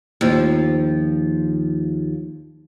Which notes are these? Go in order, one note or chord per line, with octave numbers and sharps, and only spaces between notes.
D#2 F3